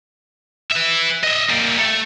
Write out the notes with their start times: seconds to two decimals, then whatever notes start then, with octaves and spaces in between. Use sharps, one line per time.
0.71 B4 E5
1.23 D#5 E5
1.49 G3 A#3
1.79 A3